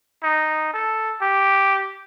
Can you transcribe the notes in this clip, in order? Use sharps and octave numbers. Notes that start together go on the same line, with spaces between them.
D#4
A4
G4